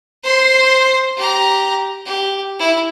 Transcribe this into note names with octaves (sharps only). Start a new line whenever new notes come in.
C5 C6
G4 A#5
G4
E4